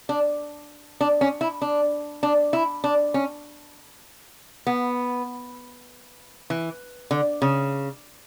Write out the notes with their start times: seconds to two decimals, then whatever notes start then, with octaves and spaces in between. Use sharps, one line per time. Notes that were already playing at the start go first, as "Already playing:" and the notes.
0.09 D4
1.01 D4
1.21 C#4
1.41 E4
1.62 D4
2.23 D4
2.53 E4
2.84 D4
3.14 C#4
4.67 B3
6.50 E3
7.11 D3
7.42 C#3